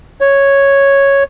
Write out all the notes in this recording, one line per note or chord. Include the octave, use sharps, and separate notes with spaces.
C#5